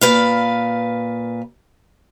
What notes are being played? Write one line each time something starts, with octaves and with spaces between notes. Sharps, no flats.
A#2 B4 F5